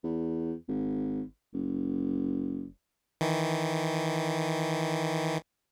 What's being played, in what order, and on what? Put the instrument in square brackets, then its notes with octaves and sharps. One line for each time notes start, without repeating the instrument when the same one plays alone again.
[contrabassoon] E2
G#1
F#1
[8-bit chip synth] D#3 E3